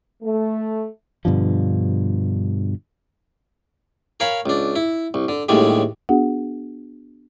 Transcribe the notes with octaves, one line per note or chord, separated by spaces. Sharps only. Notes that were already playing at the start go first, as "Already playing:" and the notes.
A3
G2 B2 D3 F3
A#4 C#5 F5 G#5 B5
C#2 D4
E4
C2
D3
D#2 A2 D3 G3 G#3
B3 D4 F#4 G#4 F#5